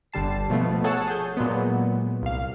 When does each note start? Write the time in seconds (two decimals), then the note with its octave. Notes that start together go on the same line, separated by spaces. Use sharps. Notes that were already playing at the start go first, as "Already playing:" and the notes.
0.12 G1 D3 G3 A5 C7
0.50 B2 F3 A3 B3
0.84 A3 G#4 A4 C#5 F#5 A5
1.07 G#4 G6
1.37 A#2 F#3 G#3 B3
2.22 C2 F5